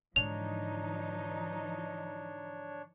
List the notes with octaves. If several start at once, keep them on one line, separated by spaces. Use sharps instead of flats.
G#2 D3 E3 F3 D4 D#4 C#5 F7